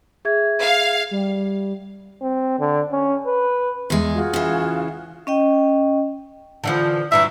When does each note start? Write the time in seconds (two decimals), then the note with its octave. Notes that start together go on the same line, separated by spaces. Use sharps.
0.25 G#4 E5 G#6
0.62 F5
1.11 G3
2.22 C4
2.60 D3
2.92 C#4
3.27 B4
3.90 E2 G#3
4.14 F4 F#4 G#4
4.34 C#3 E3
5.27 C#4 D#5 G5
6.64 D3 E3 F3
7.12 G2 E3 F#3 E5